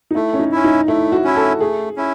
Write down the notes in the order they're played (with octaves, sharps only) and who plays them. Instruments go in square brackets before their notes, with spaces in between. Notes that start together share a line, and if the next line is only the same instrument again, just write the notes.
[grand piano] D#4
[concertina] A3 [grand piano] E4
[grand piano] C#4
D#4
[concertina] C#4 E4
[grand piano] D#4
[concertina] A3 [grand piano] E4
[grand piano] F#4
[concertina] C#4 E4
[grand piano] A4
[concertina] A3 [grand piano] G#4
[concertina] C#4 E4